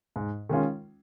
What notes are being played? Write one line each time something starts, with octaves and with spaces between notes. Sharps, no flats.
G#2
D#3 G#3 C#4 F4